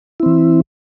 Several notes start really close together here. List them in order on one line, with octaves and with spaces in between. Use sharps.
E4 C4 E3